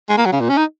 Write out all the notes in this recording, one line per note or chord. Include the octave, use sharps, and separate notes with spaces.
G#3
A#3
F#3
C#3
A#2
C#4
D#4